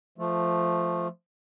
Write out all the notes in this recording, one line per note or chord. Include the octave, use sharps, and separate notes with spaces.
F3 A3